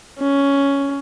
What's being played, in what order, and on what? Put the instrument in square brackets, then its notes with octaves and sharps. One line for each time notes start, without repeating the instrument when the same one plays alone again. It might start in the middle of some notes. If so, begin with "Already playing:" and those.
[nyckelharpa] C#4